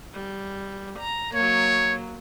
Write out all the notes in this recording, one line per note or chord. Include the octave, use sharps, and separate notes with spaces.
G3
A#5
F#3 A#3 C#5